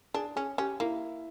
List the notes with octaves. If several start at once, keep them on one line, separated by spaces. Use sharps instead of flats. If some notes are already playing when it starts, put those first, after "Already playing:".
D4 G#4
C#4 G#4
C#4 G4
A#3 E4